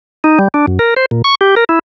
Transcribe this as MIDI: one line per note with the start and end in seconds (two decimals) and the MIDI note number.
0.24 0.39 63
0.39 0.48 55
0.54 0.66 62
0.67 0.79 42
0.79 0.94 70
0.96 1.06 72
1.11 1.22 46
1.24 1.35 85
1.41 1.55 67
1.56 1.64 70
1.69 1.79 64